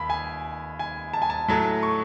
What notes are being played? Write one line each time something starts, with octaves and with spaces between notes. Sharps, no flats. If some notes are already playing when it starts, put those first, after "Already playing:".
Already playing: D#2 B5
G#5
G#5
A5
G#5
A5
A2 F#3 A3
C#6